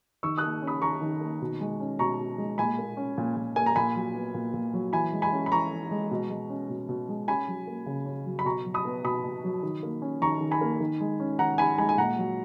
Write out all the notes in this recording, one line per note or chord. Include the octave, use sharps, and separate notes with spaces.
D#3 C#6 E6
A#3 D#6 F#6
C#4
B5 D#6
D#3 A#5 C#6
D#3
A#3
B2
G#3
C#4
B2 A#5 C#6
B2
G#3
A#2 G#5 B5
A#3
C#4
A#2
A#2
A#3 G#5
A#5
A#2 G#5 B5
F#3
B3
A#2
A#2
F#3
E3 G#5 B5
G#3
G#5 B5
C#4
B5
E3 A#5 C#6
E3
G#3
B2
G#3
C#4
B2
B2
G#3
C#4 G#5 B5
F#3
A#3
C#3
C#4
F#3
B5
B2 A#5 C#6
F#3
B5 D#6
B3
B2 B5 D#6
B2
F#3
D#3
A#3
C#4
D#3 A#5 C#6
D#3
G#5 B5
A#3
D#3
G#3
C#4
D#3 F#5 A#5
D#3 G#5 B5
G#3 G#5 B5
G#5
A#2 F#5 A#5
F#3